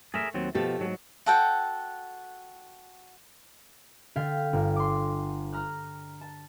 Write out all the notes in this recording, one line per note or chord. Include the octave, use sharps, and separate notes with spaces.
A3 G#4 A#4 E5
D#2 F#3 C4
B2 F3 A3 G4 A4
G#2 F#3
F#4 A4 F#5 G5
D3 A4 F5 G5 G#6 B6
G1
C6 D6
A#5 F6 F#6
A5